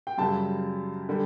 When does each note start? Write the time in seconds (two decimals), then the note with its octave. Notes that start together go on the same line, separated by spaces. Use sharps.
0.07 G5
0.18 F#2 C#3 G3 A5
1.09 D3 G3